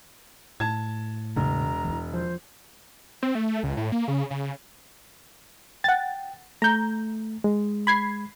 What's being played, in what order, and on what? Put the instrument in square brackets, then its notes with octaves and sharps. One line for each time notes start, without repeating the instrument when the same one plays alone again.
[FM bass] A2 [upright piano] A5 G#6
[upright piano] E1 [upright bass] C#3 E3 [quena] A#5
[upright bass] E3 E4
[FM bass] F3 [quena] C5
[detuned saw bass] C4
A3
C#2
A2
A#3
C#3
C#3
[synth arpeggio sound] F#5 A6 [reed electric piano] G5
[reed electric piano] A3 [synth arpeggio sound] A#5 G6
[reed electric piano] G#3
[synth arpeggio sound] B5 G#6 C7